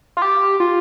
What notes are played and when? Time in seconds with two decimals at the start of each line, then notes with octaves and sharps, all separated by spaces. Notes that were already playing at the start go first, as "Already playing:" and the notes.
0.17 F4
0.22 G4
0.60 F4